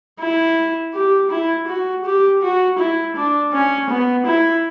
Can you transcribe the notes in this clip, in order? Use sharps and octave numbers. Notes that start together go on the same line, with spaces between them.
E4
G4
E4
F#4
G4
F#4
E4
D4
C#4
B3
E4